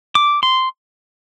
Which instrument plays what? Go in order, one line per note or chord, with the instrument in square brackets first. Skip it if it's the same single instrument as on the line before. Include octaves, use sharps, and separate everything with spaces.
[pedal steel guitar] D6
C6